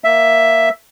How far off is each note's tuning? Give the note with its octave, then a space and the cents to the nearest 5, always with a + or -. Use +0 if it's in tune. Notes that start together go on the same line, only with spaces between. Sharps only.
A#3 +0 E5 +5